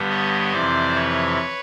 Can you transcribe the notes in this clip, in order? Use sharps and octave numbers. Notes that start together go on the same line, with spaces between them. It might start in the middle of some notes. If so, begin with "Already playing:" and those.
Already playing: G2 D3 G3 B3
C#5 D#5
F2 C3 E3 C5 D5
B4 C#5